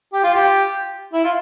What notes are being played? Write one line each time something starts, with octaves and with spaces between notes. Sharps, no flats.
G4
F4
G4
E4
F4